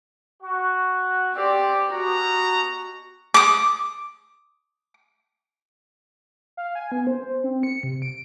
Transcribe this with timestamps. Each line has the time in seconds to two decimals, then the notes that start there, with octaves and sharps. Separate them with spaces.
0.42 F#4
1.34 C4 G4 D5
1.92 B2 F#4 A#5
3.34 D6 D#6
6.57 F5
6.75 G#5
6.92 B3
7.07 C5
7.44 C4
7.63 C#7
7.83 C3
8.02 D7